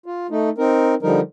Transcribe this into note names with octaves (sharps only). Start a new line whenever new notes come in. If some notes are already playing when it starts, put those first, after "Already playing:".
F4
A3 D#4
C4 D#4 A#4
D3 F3 G3 D#4 A#4